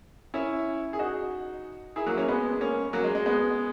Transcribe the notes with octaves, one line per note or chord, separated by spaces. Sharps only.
C#4 E4
G#4
D#4 F#4
E4 G#4
F#3 A#3
A#3 C#4
G#3 B3
A#3 C#4
F#3 A#3
G#3
G#3
G#3 B3